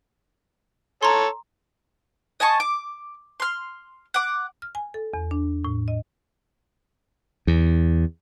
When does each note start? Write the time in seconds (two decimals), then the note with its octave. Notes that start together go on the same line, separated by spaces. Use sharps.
1.03 A4 C#5 A#5 C6
2.40 D#5 G#5 A5 C#6
2.60 D6
3.40 C6 F6
4.14 F#5 D6
4.62 F6
4.75 G#5
4.94 A4
5.14 E2
5.31 D4
5.65 A2
5.88 D#5
7.47 E2